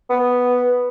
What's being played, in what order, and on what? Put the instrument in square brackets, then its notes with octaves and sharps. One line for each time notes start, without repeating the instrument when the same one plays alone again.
[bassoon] B3